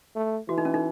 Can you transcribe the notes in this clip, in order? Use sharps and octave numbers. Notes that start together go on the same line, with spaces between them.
A3
E3 F#4
D#4
C#4
D#4